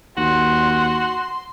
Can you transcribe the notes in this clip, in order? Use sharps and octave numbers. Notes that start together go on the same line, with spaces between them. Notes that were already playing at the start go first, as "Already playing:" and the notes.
D#2 F#4 C6